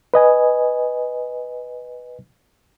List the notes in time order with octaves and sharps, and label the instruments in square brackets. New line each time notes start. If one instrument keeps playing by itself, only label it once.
[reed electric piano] B4 D#5 G#5